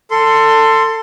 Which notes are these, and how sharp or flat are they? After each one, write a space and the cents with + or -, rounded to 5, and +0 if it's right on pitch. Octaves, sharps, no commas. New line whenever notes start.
A4 +20 C6 -5